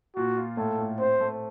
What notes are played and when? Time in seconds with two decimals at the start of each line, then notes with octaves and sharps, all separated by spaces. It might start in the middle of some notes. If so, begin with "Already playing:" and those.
0.16 A#2 F#4
0.37 F4
0.57 A2 A4
0.79 A2
0.99 C4 C5
1.20 A3